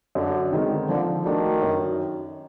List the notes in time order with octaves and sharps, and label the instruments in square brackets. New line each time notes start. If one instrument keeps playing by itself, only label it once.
[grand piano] F#2 [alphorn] D3
[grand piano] D#3 G#3 C4
[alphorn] D3 [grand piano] F3
[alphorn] D#3 [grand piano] A3 D4 F#4
[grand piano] F#2